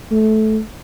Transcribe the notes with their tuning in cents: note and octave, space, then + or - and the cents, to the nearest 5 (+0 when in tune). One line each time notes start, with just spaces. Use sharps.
A3 -15